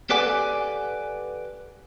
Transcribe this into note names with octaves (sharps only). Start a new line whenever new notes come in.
G4 A4 B4 D5 F#5 G#5